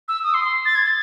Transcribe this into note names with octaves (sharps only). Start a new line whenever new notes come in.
E6
D#6
C6
C6
A6
G#6
A6